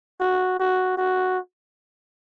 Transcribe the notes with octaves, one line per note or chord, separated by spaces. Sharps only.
F#4
F#4
F#4